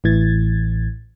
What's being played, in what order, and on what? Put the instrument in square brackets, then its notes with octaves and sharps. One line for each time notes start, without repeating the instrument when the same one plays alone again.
[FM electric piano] A1 A2 E3 G#6 A6